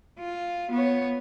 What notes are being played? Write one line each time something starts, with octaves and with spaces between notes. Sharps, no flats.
F4
B3 C#5